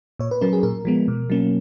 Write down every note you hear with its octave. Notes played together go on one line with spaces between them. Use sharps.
A#2 C#5
B4
F#3 C#4 A#4
G#4
A#2 A#4
F3 G#3 B3
B2
F#3 A#3 C#4